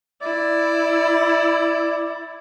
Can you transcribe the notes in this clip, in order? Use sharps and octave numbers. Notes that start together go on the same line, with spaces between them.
E4 D5